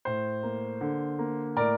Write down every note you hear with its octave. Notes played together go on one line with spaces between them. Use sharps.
A2 C5
A#3
D3
A#3
A2 A#4 D5